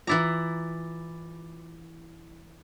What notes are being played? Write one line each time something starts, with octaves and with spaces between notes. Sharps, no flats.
E3 E4 F4 A#5 D6 A6